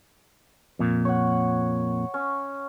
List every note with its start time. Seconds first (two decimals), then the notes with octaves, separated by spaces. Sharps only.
0.79 F2 A#2
1.05 C#5 F#5
2.14 C#4